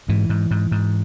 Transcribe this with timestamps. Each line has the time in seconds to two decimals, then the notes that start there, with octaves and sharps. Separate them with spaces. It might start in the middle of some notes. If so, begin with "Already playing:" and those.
0.09 G#2 E3
0.29 G#2
0.51 G#2
0.72 G#2